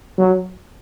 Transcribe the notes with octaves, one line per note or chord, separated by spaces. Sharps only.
F#3